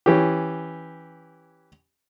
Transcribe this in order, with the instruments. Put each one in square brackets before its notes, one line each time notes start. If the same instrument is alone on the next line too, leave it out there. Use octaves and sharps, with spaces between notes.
[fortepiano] E3 C#4 G4